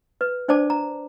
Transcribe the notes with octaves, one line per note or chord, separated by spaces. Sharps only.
B4
D4 C5 D5 A5 D6
A#5